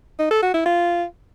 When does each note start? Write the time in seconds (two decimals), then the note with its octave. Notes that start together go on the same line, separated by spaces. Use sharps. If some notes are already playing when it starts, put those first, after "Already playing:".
0.19 D#4
0.31 A4
0.42 F#4
0.54 E4
0.65 F4